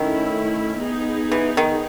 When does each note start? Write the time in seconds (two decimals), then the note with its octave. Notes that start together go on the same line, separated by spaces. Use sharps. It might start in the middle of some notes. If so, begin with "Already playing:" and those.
Already playing: D#3 A3 C#4 E4
0.80 B3 D#4 G#4
1.32 E3
1.57 D#3